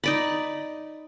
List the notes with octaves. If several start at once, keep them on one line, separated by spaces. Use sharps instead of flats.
D#4 D5 B5